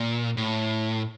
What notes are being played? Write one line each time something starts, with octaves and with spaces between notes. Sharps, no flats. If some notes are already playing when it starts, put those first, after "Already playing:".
Already playing: A#2
A2